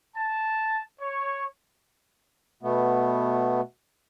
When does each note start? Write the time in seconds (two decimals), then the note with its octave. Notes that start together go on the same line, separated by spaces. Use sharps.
0.16 A5
1.01 C#5
2.63 B2 A3 B3